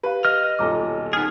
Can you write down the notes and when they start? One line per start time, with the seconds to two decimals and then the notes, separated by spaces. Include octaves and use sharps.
0.03 G4 B4 F5
0.25 D#5 F6
0.59 D#1 B1 F4 A4 A#5 D6
1.13 B3 D#4 G#4 F6